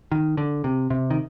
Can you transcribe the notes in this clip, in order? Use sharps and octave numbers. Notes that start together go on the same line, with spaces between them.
D#3
D3
C3
C3
D#3